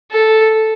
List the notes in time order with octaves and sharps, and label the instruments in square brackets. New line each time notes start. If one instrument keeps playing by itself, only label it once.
[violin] A4